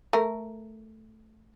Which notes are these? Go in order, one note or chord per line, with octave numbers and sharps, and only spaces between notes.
A3 A#4